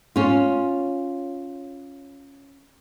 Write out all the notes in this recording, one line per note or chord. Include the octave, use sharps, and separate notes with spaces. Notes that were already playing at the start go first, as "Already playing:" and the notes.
C#4 F4